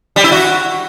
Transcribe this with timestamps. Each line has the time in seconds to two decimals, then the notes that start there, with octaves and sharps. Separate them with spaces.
0.16 G3
0.24 E4
0.32 F#4